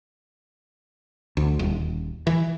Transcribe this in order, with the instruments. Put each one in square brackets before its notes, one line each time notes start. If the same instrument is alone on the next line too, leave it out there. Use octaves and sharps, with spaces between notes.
[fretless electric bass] D2
D#1
E3